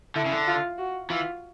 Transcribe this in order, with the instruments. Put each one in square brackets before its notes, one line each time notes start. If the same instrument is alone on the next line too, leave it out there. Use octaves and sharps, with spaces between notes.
[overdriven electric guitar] D3 [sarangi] E4
[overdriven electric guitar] C#3
D3
[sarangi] F4
F#4
[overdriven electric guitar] E3 [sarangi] F4